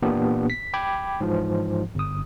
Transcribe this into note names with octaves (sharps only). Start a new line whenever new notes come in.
A#2 E3 A#3 B3 D4 G4
B6
G5 B5 D6 G#6
G#2 E3 F3
G1 D#6